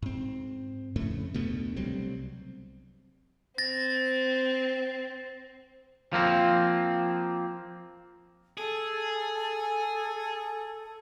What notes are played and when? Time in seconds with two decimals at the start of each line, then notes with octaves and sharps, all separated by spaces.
0.02 G#2 C4
0.96 F2 A2 C#3 A3
1.34 D2 B2 A3 B3
1.76 C2 F#3 G3 C4
3.58 C4 A6 A#6
6.13 F3 A#3 C4
8.58 G#4 A4